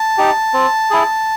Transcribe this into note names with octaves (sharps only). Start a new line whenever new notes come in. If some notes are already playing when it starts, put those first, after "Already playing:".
Already playing: A5
D#4 G4
C4
E4 G#4